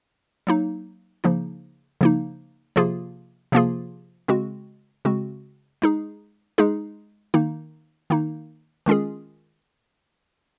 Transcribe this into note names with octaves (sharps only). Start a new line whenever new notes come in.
F#3 A#3 D#4
C#3 F3 A#3 D#4
C#3 F3 A#3 D#4
C3 F3 A#3 F4 G#4
C3 F3 A#3 F4 G#4
C#3 G#3 C4 F#4
C#3 G#3 C4 F#4
G#3 D#4 G#4
G#3 D#4 G#4
D#3 A#3 D#4
D#3 A#3 D#4
D#3 G#3 C#4 F4 G#4